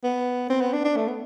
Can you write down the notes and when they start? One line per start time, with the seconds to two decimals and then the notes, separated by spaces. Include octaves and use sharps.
0.04 B3
0.50 C4
0.61 B3
0.73 D4
0.84 D4
0.97 A3
1.08 B3